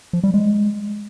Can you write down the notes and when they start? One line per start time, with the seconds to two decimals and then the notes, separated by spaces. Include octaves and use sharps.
0.13 F3
0.24 G3
0.34 G#3